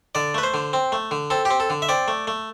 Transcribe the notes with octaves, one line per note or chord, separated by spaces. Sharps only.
D3 D5
A3 B4
C5
D3
C4
A3
D3
C4 A4
G4
C4
A4
D3
E5
C4 D5
A3
A3